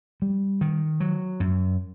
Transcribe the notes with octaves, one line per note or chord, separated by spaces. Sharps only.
G3
D#3
F#3
F#2